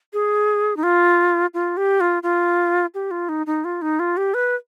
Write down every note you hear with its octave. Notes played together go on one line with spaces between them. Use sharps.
G#4
D#4
F4
F4
G4
F4
F4
G4
F4
D#4
D#4
F4
D#4
F4
G4
B4